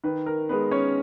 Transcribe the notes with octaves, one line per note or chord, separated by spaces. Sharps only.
D#3 B4
A#4
G#3 B3 B4
C#4 C#5